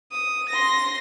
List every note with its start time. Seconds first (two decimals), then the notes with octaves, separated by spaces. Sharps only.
0.11 D#6
0.49 C6 A#6